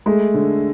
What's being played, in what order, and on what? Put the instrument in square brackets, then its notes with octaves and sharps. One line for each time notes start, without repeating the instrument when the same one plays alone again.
[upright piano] G#3 [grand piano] A3
[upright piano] D3